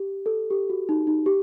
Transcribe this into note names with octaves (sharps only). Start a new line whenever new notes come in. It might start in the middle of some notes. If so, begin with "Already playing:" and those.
Already playing: G4
A4
G4
F#4
D#4
D#4
G4